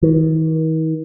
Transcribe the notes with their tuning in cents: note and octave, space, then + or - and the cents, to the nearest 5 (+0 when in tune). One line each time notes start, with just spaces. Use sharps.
D#3 +45